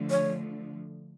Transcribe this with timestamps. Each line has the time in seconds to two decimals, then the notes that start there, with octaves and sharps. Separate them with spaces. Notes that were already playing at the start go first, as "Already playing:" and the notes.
Already playing: D3 F3 A3
0.10 C#5